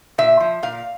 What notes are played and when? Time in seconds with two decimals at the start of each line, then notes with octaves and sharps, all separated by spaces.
0.18 A#2 E5
0.40 F3
0.63 A#2 F5